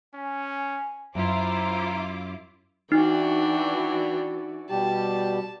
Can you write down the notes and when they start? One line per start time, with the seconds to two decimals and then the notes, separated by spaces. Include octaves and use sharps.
0.14 C#4 G#5
1.15 F#2 E4 F4 C5 A#5 D6
2.92 E3 D4 D#4 F#4 D5 G5
4.70 B2 G3 G4 A5